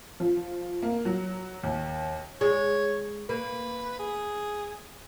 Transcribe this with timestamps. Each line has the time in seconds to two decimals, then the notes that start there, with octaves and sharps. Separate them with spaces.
0.20 F3
0.82 A#3
1.05 F#3
1.63 D#2
2.41 G#3 C#5
3.29 A#3 B4
3.99 G#4